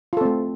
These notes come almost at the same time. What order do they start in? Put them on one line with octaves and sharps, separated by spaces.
F4 A4 C4 A3